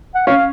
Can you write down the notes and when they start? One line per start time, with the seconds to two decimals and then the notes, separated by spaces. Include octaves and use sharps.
0.15 F#5
0.27 C#4 C#5 F5